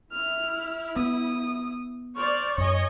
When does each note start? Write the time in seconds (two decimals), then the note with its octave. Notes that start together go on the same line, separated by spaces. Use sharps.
0.12 E4 F6
0.96 B3 D#6
2.16 C5 D5 C#6 F6
2.58 F#2 C#5 D#5 G#5 C#7